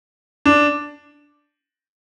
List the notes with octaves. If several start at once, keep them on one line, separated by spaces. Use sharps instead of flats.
D4